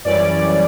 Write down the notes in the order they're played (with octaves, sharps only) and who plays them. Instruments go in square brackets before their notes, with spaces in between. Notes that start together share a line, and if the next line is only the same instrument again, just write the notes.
[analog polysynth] F#2 E3 G3 C#4 D5